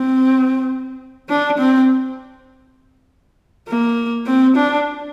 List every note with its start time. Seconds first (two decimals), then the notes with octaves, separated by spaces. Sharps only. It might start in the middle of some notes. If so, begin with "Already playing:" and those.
Already playing: C4
1.29 D4
1.59 C4
3.68 A#3
4.26 C4
4.56 D4